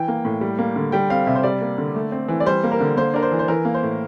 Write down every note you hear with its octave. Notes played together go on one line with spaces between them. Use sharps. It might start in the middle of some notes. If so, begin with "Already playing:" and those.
Already playing: E3 G5
A#3
A2
G3
A#3
D3
G3 G5
C4 F5
C3 E5
C5
G3 D5
A#3
D3
A3
C4
E3
D5
G3 C5
A#3
A#4
D3
A#3 C5
D4 A#4
C5
E3
C5
E3 A#4
A#3
C5
A2